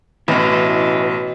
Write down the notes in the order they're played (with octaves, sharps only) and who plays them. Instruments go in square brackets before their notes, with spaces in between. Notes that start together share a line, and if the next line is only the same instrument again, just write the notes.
[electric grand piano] A1 [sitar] F2 B2 [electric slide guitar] E4 B4